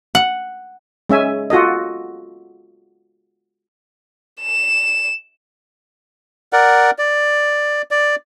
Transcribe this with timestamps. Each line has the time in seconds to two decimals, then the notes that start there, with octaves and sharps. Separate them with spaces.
0.15 F#5
1.09 G#3 C#4 E5 G#5
1.50 F4 F#4 A4 D#5
4.41 E7
6.53 A#4 D5 F#5
6.98 D5
7.91 D5